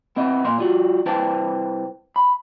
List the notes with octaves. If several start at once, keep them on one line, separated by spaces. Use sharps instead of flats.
B3 C4 E4 D#5
A#2 A#3 C6
G3 F4 F#4
C2 E4 B4 C5 G5 A5
B5